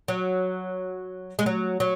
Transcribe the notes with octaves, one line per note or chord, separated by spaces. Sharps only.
F#3
G#3
F#3
F#3